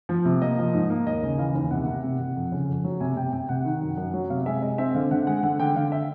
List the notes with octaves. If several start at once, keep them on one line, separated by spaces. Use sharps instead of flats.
F3
C3
A#3 D#5
F3
G#2
A#3
D#2 D#5
C#3
E3 F5
D#2
C3 F#5
C3
C3
C3
F2
C#3
F2
F#3
C3 G#5
C3 G5
C3 G5
C3 F#5
D#3
F#2
F#2
F#3
C3 F5
G#3 E5
G#3 D#5
C4 E5
D3 F5
D3 F#5
G#3 F#5
D3 F#5
D3 G5
D3 F5
E5